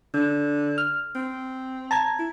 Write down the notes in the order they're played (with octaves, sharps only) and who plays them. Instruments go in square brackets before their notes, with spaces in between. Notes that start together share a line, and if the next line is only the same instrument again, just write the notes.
[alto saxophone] D3
[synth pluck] F6
[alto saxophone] C4
[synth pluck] A5 A#5 G#6
[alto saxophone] E4